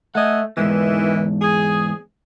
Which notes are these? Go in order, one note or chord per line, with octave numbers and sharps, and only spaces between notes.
A3 D#5 F#5 G#5
E2 G#2 D#3 E3
G#4